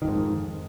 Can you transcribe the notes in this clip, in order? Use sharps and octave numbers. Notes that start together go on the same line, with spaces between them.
F2 G#2 D#3